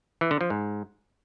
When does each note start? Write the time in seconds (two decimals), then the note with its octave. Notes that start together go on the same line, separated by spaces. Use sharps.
0.21 E3
0.31 D3
0.41 F3
0.50 G#2